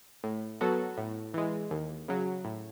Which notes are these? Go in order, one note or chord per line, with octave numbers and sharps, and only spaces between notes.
A2
F#3 B3 F#4 A4
A2
E3 G#3
D#2
C#3 F#3
A2